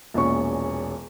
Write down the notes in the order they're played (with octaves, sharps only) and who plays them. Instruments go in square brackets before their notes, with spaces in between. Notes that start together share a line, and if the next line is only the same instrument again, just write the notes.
[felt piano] E1 A#1 C#4 C#6